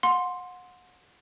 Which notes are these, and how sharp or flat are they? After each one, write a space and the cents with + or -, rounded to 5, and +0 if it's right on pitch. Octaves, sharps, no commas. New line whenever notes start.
F#5 -30 C6 +0